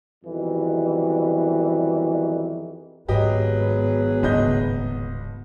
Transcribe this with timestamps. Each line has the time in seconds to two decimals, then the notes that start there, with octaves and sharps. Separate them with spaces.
0.24 F2 B2 D#3 E3 G3
3.09 G#1 G#2 F#3 B3 G4 G#4 B4 D#5
4.23 D1 G1 C#3 D#5 G6